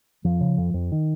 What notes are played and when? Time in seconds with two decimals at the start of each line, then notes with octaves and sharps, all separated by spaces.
0.24 F2 F3
0.41 C#3
0.58 F2
0.74 F2
0.92 D#3